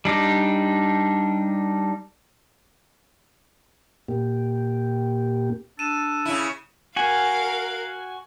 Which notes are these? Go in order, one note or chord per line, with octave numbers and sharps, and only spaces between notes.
G3 D4 D#4
A#2 A#3 G4
D4 A4 D#7 E7
C#3 E4
F#4 A#4 F5 G#5